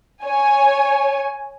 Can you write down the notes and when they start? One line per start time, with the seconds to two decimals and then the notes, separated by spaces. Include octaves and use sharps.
0.24 C#5 G#5